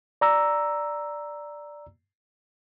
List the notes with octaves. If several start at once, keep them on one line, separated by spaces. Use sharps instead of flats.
D5 A#5 E6